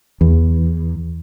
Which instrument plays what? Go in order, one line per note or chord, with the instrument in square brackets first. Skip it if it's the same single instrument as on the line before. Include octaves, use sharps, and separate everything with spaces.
[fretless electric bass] E2